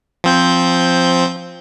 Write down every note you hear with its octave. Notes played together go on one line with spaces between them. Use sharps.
F3 C4 G6